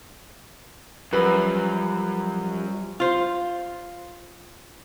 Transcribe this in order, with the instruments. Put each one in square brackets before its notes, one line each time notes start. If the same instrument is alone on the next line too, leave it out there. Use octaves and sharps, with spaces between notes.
[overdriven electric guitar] F#2 [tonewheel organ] F3 G3 [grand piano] B4
[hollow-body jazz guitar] F4 C5